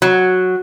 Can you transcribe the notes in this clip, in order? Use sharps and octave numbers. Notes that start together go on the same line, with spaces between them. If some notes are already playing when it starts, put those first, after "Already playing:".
F#3